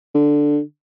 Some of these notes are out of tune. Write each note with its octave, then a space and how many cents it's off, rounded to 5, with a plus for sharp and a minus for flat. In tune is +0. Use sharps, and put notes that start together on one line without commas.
D3 +0